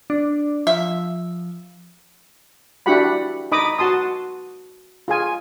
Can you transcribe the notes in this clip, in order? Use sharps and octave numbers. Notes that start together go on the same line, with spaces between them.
D4
F3 E5
D4 E4 F#4 G4 F#5 B5
D#4 D#5 B5 D6 D#6
F#4 A5 C6 D#6
F4 G#4 G#5